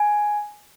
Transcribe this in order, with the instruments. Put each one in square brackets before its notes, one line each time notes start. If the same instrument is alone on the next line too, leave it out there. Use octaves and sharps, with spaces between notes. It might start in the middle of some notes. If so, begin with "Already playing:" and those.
Already playing: [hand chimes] G#5